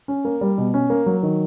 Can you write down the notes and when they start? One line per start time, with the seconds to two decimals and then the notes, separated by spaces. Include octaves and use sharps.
0.08 C#4
0.25 A#3
0.41 G3
0.58 B2
0.74 C#4
0.90 A#3
1.06 F#3
1.23 D#3